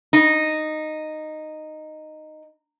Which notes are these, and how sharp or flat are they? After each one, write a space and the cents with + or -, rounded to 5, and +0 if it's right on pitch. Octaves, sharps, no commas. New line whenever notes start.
D#4 -10